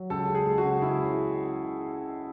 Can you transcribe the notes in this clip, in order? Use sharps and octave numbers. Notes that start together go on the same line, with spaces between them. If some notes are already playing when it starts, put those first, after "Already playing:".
Already playing: F#3
C#2 A4
G#3
G#4
G#3
F#4
C#3
C#2 E4
C#3